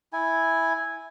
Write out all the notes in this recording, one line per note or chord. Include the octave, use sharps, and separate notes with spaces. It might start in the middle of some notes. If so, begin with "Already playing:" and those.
E4 G#5